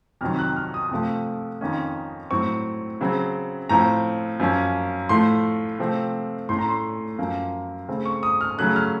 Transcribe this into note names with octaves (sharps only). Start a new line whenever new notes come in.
F2 C3 D#3 F#3 F6
F#6
F6
D#6
C3 F3 A3
F2 D#3 A#3 C#4
A2 F#3 C4 C#6
C#3 F#3 C4
A2 F3 C4 A#5
F#2 F3 A#3 C#4
A2 F3 A3 C6
C3 F3 A3 C4
A2 A3 C#4 C6
A#5
C6
F#2 F3 A#3
C#3 A3 C4
C#6
D#6
F6
C#3 F#3 A3 C#4 F#6
F6